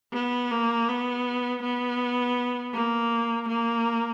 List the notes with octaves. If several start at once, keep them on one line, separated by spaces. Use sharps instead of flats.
B3
A#3
B3
B3
A#3
A#3